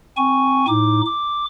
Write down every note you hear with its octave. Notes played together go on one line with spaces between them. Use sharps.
C4 G#5 C#6
A2 D#4 D6
D6